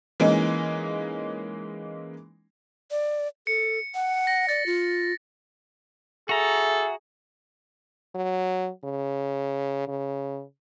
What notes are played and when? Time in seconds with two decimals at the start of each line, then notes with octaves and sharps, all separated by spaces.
0.20 E3 G#3 A#3 C#4 D#4
2.91 D5
3.47 A4 C#7
3.95 F#5
4.27 A#6
4.49 D5 A6
4.66 F4
6.29 F#4 G#4 A4 E5 A#5
8.15 F#3
8.84 C#3
9.88 C#3